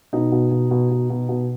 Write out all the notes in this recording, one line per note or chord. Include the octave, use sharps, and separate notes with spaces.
B2 D#4
B2
B2
B2
B2
B2
B2